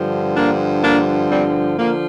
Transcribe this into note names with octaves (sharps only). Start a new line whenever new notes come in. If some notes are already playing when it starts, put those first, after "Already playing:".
Already playing: G2 D3 F3
A#3 D4
A#3 D4
G3 C4
D3 F3 A#3